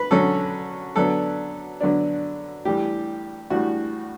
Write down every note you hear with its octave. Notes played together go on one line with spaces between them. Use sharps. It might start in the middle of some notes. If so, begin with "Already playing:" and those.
Already playing: B4
D3 F#3 C#4 A4
D3 F#3 B3 D4 A4
D3 F#3 B3 D4
A2 E3 G3 G4
A2 E3 G3 F#4